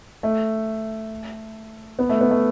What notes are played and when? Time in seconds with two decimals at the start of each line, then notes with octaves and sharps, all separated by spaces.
0.23 A3
1.99 B3
2.09 A3
2.21 B3
2.31 A3